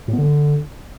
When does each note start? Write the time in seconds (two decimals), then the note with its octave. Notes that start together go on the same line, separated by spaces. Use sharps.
0.08 A2
0.13 B3
0.19 D3